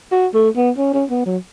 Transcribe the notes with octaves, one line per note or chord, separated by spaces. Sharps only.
F#4
A3
B3
C#4
C#4
B3
F#3